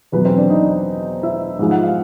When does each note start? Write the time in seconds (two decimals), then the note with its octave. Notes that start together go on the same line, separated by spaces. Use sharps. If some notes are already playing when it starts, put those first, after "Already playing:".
0.12 E2 B2 F#3 B3 B4
0.25 C4 C5
0.38 D4 D5
0.50 D#4 D#5
1.23 E4 E5
1.59 G#2 F3 G#3
1.71 F#5
1.83 F5